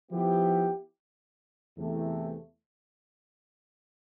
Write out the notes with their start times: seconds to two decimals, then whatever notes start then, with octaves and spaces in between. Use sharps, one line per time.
0.11 F3 B3 E4 G4
1.78 E2 C3 E3 A3